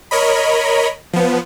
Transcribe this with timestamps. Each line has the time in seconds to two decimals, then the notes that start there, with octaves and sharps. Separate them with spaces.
0.11 A#4 C#5 D#5 B5
1.13 F3 B3